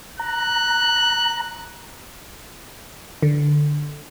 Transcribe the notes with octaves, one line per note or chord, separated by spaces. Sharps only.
A#5 F#6
D3